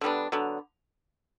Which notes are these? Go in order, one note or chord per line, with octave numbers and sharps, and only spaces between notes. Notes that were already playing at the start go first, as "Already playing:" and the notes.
D3 G3 B3 D4
D3 F#3 B3